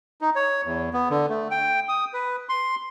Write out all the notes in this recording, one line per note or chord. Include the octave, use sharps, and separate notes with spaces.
D#4
C#5
E2
B3
D3
A3
G5
D#6
B4
C6